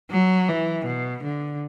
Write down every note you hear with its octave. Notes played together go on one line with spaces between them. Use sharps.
F#3
E3
B2
D3